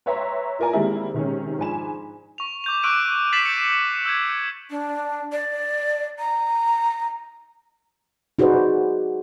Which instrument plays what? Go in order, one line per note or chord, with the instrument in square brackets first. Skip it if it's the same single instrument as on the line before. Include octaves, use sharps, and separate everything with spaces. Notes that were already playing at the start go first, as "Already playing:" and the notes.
[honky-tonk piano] B4 C#5 E5 G5 A#5 C6
E4 F4 A#4 D5 G#5 A#5
D#3 G3 G#3 A#3 C4 E4
C3 D#3 G#3 C#4
G#2 F3 D4 G#5 B5 E7
[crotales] C#6 F7
D6 G6 F7
C#6 D6 E6 F#6 D7 D#7
A6 B6 C7 D#7 E7 F#7
G6 C#7
E6 G6 G#6
[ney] D4
D5
A#5
[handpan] D#4 F#4 G#4 B4 C5 D5